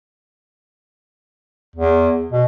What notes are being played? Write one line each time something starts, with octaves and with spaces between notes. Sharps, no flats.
E2
B2